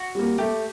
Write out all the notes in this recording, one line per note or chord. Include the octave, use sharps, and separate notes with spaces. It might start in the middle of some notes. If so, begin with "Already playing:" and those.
Already playing: F#4
G3 A#3
A3 G4